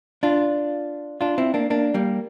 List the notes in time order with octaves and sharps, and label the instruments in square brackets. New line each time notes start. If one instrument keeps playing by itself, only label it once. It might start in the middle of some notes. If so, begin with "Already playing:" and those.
[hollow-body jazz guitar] D4 F4
D4 F4
C4 E4
A#3 D4
A#3 D4
G3 A#3